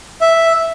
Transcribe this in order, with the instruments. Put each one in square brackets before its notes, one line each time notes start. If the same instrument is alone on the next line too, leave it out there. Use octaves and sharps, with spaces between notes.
[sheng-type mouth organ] E5